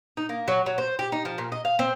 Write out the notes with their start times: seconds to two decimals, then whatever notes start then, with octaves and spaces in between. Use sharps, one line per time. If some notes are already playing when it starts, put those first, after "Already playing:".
0.17 D#4
0.29 A#3
0.48 F#3
0.66 F#3
0.78 C5
0.99 G4
1.12 D#4
1.25 F3
1.38 A#2
1.52 D#5
1.65 F5
1.79 C4